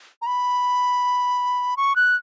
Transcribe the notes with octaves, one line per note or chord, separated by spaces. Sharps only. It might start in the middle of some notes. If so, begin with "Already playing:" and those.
A#5
B5
C#6
F#6